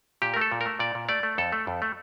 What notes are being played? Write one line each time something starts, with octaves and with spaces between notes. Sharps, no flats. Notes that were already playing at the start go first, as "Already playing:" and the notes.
A#2 G4
A#4
A3
A4
A#2
A#4
A3
A#2 D5
A#2
A3 D5
A3
F2 A4
A3
F2
A3